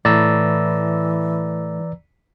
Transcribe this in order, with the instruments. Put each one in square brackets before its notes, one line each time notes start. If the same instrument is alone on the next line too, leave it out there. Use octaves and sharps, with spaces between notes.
[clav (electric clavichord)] A2 [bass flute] E3 [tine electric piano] D5 A#5 E6